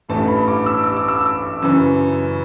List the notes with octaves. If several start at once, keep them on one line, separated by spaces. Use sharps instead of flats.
A1 G2 E3 A3 A5
B5
D6
E6
E6
D6
E6
F#2 C#3 E3